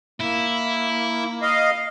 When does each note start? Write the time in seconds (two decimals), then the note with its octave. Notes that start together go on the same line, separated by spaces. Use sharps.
0.21 A#3 E4
1.42 D#5 F5